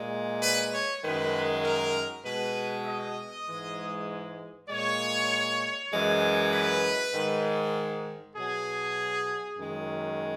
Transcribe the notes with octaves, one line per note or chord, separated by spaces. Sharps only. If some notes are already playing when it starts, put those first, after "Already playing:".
Already playing: A#2 G#3
B4
C#5
F#2 D#3 G#3 B4
A#4
B2 G#3 B4
D#5
G#2 E3 G#3
A#2 G#3 C#5
F#2 E3 G#3
B4
G#2 D#3 G#3
B2 F#3 G#4
F#2 D#3 G#3